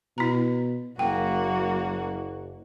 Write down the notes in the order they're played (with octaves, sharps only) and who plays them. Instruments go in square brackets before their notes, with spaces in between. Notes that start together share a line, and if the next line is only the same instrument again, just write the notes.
[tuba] B2 [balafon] E4 A#5
[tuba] F#1 [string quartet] F#3 A#3 F#4 [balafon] G5